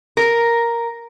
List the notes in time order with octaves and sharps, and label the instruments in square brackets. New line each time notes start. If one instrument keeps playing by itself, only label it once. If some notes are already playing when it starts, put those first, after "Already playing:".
[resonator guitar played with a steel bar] A#4